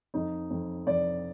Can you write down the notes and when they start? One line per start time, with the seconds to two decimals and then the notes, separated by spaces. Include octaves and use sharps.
0.14 F2 D#4
0.50 F2
0.86 F2 D5